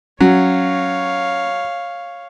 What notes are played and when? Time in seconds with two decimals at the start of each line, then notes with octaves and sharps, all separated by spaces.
0.21 F#3 C#4 C#5 F5